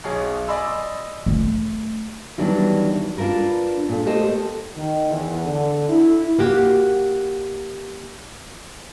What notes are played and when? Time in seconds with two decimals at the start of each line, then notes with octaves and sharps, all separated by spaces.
0.04 B1 B2 G#4 C#5
0.48 D5 D#5 G#5 B5 C6 E6
1.26 A3
2.38 D#3 E3 F#3 G3 B3 D4
3.17 D4 F4 G4 A#4 B4
3.89 A#2 A4
4.06 A3 A#3 G4 A4 C5 D#5
4.75 D#3
5.08 E2
5.44 D3
5.89 E4
6.39 A#3 F#4 G4